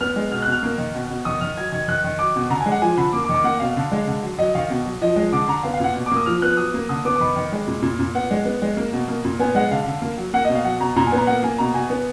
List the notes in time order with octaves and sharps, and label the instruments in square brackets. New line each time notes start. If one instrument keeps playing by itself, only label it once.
[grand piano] B3 F6
G#3
B2 F6
F#6
B2
F6
A#3
D#3
B2
B2
D#3 D#6
D#3 F6
F#3 G#6
D#3 G#6
D#3 F#6
D#3
F#3 D6
B2
D3 A#5
G#5
G#3
F#5
F3 G#5
D3 B5
A#3 D6
D6
D#3
D6
A#3 F#5
B2 F5
D3
G#3
D3
F#3
F#3 D#5
D#3 F5
B2
F#3
F3 D#5
G#3
D3 D6
D3 A#5
B3 F5
F5
A#2 F#5
B2
D6
A#3 D#6
F3 F6
B3 F#6
F#3 D#6
A#3
D3 D#6
B3 D6
D6
D#3 B5
D#3
G#3
A#2
A#2
A#2
B3 F#5
G#3
B3
G#3
A#3
B2
A#3
A#2
B3 G#5
G#3 F#5
D3 F5
D3
A#3
F#3
A#3 F#5
D#5
B2
F5
F#3 F#5
B2 A#5
A#2 A#5
G#5
B3
A#5
A#3 F#5
A#3 G#5
B2 A#5
B2 G#5
B3